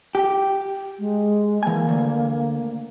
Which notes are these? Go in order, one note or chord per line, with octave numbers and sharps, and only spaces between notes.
G4
G#3
E3 A#3 G#5
D2